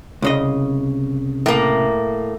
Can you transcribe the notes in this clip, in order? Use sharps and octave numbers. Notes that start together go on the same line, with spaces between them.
C2 C#3 D#5
A2 A#3